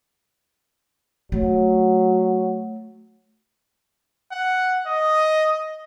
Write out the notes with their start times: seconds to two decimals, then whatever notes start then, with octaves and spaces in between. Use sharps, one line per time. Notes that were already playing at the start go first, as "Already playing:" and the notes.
1.32 F#3 A3
4.31 F#5
4.86 D#5